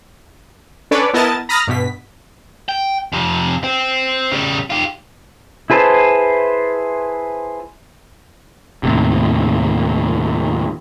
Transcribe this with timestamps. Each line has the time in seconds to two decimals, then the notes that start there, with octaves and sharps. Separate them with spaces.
0.91 C#4 D4 A4 B4 C#5 D5
1.13 B3 E4 A#4 D#5 A5 A6
1.49 A#5 B5 D#6 F6 A6 A#6
1.67 G2 B2 B6
2.69 G5
3.12 F2 C3
3.64 C4
4.31 C#3 G3
4.70 F4 G4
5.70 E4 G#4 B4 C5 A5
8.83 D#2 A2 C3